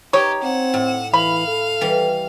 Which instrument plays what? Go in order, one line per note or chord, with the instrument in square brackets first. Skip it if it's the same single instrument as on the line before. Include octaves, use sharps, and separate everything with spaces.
[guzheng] D#4 D#5 [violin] G4 [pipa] C#5
[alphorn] C4 [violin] F#5 E7
[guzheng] A2
[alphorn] E3 [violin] F5 [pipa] B5
[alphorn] A4
[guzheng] E3 G3